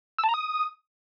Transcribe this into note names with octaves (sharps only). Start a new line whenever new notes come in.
E6
A5
A#5
D#6